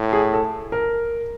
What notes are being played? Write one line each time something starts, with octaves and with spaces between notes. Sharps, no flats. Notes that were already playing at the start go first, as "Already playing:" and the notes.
Already playing: A2
G#4
A4
A#4